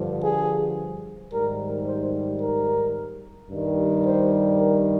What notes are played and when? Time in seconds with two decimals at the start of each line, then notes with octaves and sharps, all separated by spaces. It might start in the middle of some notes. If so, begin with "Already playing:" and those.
Already playing: G2 D3 F3
0.23 G#4
1.31 G#2 D#3 G3 A#4
1.87 C5
2.41 A#4
3.50 G2 D#3 G3
4.04 C5
4.58 A#4